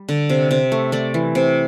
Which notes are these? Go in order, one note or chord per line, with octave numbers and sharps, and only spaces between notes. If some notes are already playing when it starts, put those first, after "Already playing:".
Already playing: G3
D3
C3
C3
A3
A3 D5
E3
C3